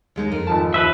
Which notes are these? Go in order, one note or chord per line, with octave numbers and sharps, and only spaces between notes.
D#2 G#3 D#4
F2 A#4
G#1 F3 A5
D#2 F3 B4 E5